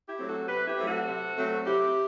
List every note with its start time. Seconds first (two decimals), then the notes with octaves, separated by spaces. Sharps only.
0.08 E4 G4
0.18 F#3 A3 C4
0.28 F#4 A4
0.47 C3 G4 B4
0.67 E4 G4
0.77 F#3 A3 C4
0.87 F#4 A4
1.07 C3
1.36 F#3 A3 C4
1.66 C3 E4 G4